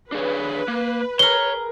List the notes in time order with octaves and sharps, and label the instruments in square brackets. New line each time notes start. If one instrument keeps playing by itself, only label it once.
[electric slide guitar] D4 G#4 C#5 [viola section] B4
[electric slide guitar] A#3
[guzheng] G#4 A#4 [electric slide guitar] C#5 [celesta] G7